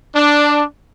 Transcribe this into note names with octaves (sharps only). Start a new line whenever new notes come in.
D4